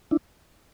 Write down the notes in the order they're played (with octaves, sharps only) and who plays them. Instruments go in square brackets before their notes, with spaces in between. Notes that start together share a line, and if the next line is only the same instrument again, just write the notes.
[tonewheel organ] D4 E4